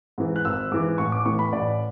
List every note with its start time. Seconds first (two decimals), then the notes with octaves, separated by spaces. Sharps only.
0.18 G#2 E3
0.36 F#6
0.45 G#1 E6
0.71 G#2 E3 D6
0.98 A1 C#6
1.12 D6
1.25 A2 E3 C#6
1.39 B5
1.53 A1 D5